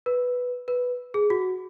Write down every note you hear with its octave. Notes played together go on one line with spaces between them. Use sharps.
B4
B4
G#4
F#4